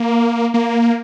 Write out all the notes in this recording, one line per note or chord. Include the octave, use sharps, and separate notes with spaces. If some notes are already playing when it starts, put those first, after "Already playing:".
Already playing: A#3
A#3